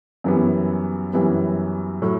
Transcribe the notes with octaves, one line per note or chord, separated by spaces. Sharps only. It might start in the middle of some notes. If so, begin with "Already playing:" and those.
F#2 E3 G3 B3
F#2 E3 G3 B3
A2 F#3